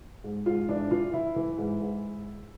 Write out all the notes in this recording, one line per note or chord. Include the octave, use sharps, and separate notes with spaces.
G#2
G#2 F4
E3 D4
E3 F4
E3 E4
E3
G#2
G#2